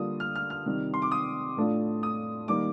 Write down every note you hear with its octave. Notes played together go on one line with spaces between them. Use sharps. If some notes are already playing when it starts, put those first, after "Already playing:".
Already playing: D3 G3 A#3 D4 F4 D#6
F6
F6
F6
C3 D#3 G3
C6
D6
D#6
A2 A3 D4 F4
D#6
D#3 G3 A#3 D6